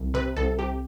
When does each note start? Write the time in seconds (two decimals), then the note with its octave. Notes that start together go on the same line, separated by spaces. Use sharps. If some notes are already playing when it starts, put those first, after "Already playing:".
Already playing: C2
0.14 C3 B4
0.36 C2 A4
0.59 C3 G4